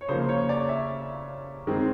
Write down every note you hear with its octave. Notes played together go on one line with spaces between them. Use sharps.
C#5
C#3 F3 A#3 C5
C#5
D5
E5
D#3 G#3 C4